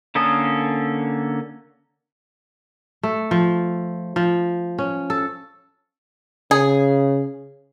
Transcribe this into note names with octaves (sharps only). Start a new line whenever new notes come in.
D3 A#3 C#4 A4 D#6
A3
F3
F3
C#4
A4
C#3 G#4